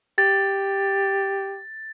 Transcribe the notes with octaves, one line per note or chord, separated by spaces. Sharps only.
G4 A6